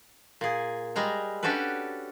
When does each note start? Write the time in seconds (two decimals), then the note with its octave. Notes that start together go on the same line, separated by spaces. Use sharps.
0.41 A#2 G#4
0.96 G3 G#3 A#5
1.43 C#4 D4 F#4 G4 A4 B4